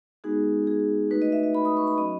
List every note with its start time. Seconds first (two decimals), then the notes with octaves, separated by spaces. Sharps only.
0.24 G#3 B3 D#4 F#4 G#4
0.67 G#4
1.11 A3 D#4 F#4 B4
1.22 D#5
1.32 E5
1.43 E5
1.55 B5
1.65 D#6
1.77 C#6
1.87 B5
1.98 F#3 C#4 F#4 D#5